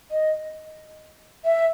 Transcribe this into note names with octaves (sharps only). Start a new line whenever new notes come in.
D#5
E5